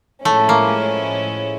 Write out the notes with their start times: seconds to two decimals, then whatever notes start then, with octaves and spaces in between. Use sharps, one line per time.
0.25 A2 F3 G#3 A3 C#4 E4
0.49 A#3